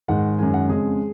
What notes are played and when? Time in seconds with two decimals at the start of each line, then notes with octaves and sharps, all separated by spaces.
0.08 G#2 D#3 G#3 F#5
0.39 F#2 D#3 G#3 G#5
0.54 F#5
0.69 F2 C#3 G#3 G#4